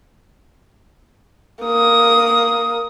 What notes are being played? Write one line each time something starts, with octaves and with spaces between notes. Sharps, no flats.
A#3 D#6